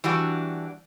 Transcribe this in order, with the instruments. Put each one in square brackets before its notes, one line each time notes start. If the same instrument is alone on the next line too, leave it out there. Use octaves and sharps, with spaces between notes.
[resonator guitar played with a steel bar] E3 G3 D4 F#4